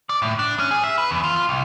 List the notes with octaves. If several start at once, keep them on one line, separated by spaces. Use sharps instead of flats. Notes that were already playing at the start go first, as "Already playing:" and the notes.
D5
A2
D4
C#4
G#4
E5
B4
E2
F4
F4
C2